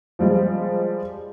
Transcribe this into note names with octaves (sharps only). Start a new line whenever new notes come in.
F3 G3 G#3